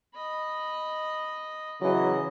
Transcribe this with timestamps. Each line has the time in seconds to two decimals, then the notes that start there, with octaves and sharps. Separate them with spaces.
0.15 D#5 B5
1.81 C#3 E3 F#3 D#5